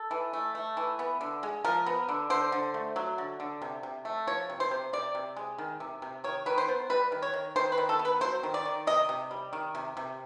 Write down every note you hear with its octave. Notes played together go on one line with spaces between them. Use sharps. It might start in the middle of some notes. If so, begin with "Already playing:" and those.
Already playing: A4
E3
A3
A3
E3
B3
D3
G#3
F3 A#4
B3
D3
D3 C5
D3
A3
F#3
D3
D3
C3
C3
A3
F3 C#5
C3
C5
C3
C3 D5
C3
G#3
D#3
C3
C3
D#3 C#5
D#3 B4
C5
B3
G3 B4
D#3
C#5
D#3
D#3 C5
B4
D#3
A4
B3
B4
F#3 C5
D#3
D5
D#3
C3 D#5
C3
G3
D#3
C3
C3